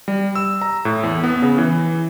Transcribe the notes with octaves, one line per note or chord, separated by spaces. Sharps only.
G3
E6
A#5
A2
E2
B3
C#3
E3